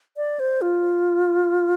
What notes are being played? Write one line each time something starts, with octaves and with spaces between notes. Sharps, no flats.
D5
C5
F4